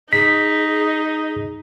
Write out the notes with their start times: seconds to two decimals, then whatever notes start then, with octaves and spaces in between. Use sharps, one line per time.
0.13 D#4 G#4 B6